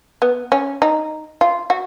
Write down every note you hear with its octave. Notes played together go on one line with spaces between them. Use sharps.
B3
C#4
D#4
F4
F#4